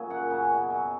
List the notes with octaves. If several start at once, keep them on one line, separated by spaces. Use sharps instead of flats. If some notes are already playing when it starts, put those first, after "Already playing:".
Already playing: A#2 C#3 F#3 E5 G#5
F#2 F#5
C#3 F#3
B2
F#3